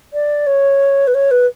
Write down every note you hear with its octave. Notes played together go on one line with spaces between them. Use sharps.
D5
C#5
B4
C#5
B4